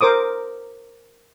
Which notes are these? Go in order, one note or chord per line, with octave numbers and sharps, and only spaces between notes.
A#4 C5 D6 D#6